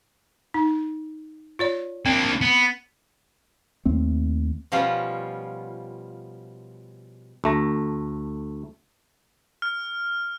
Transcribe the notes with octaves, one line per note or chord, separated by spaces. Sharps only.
D#4
F4 C#5 D5
A#3 C4 D4
B3
D#2 A3 C4
B2 F3 G3 C#4 F4
D2 A3 A#5
F6